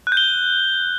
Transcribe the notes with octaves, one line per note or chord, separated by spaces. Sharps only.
F#6
G6
G7